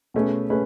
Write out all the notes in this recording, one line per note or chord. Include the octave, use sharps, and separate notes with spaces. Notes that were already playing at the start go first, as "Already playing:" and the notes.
B2 A3 C#4 G#4 B4
A3 C#4 G#4 B4